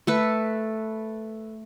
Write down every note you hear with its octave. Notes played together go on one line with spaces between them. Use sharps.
A3 A4 B4